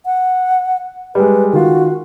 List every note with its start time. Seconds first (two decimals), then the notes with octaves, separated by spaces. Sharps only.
0.06 F#5
1.15 G3 G#3 B4
1.53 D#3 F4 F#4